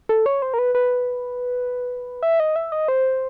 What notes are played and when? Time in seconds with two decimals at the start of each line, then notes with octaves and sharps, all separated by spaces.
0.09 A4
0.26 C#5
0.42 C5
0.54 A#4
0.58 B4
0.75 B4
2.23 E5
2.40 D#5
2.56 E5
2.72 D#5
2.88 C5